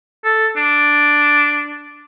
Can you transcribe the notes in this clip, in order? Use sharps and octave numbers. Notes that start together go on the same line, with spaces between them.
A4
D4